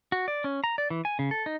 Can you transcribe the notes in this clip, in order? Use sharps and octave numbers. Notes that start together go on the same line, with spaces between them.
F#4
D5
C#4
A#5
D5
E3
G#5
C#3
A4
D#4